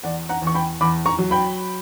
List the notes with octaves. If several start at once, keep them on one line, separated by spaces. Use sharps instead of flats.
E2 D5 F#5
F#5 A#5
E2
C#6
G5 B5
E2 B5 D6
A#5 C#6
F#3
G5 B5